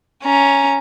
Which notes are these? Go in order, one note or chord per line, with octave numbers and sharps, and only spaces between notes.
C#4 A#5